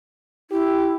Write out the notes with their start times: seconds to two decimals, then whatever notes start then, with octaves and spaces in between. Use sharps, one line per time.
0.51 E4 G4